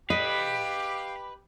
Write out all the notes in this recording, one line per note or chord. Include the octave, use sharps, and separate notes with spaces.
G4 B4 D#5 F5 B5